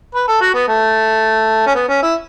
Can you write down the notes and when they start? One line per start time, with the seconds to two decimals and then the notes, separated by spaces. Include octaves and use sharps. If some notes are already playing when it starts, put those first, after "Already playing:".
0.15 B4
0.28 A4
0.41 F#4
0.54 B3
0.68 A3
1.67 C#4
1.75 B3
1.88 C#4
2.03 E4